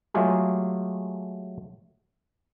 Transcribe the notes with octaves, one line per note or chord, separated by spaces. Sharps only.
F#3 G#3 A3 F4 G4 G#4